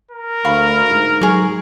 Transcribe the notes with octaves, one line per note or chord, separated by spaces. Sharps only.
A#4
D2 F5 B5 C#6
G#2
F#3 G#4 C#6